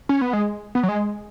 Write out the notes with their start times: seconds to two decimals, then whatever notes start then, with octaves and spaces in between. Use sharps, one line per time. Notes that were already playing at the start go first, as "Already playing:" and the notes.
0.09 C#4
0.21 B3
0.33 G#3
0.75 B3
0.83 F#3
0.89 G#3